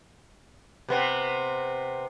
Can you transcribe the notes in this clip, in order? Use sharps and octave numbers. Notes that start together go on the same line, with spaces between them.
C3 B3 C4